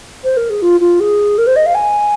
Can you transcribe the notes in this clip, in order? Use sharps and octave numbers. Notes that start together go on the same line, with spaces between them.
C5
A#4
G#4
F4
F4
G#4
A#4
C5
D#5
F5
G#5